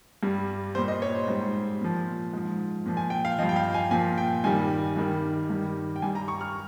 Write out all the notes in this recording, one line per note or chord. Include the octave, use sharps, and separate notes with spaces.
G2 G3
A#2 G3 C5
D#5
C#5
C5
G#2 G3 C5
A#2 F3
G#2 F3
A#2 F3
G#5
G5
F5
G2 F3 D#5
G5
F5
G#5
A#2 F3 G#5
G5
G2 D#3 G3 G#5
G2 D#3 G3
G2 D#3 G3
G5
G2 G3 G#5
A#5
C#6
F6